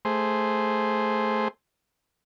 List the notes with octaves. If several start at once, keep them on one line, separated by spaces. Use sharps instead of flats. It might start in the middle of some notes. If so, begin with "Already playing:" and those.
A3 G#4 C5 C6